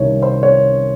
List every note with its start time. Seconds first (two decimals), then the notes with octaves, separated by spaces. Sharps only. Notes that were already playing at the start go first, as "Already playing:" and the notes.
Already playing: C2 C3 D#3 C#5
0.22 C5
0.43 C#5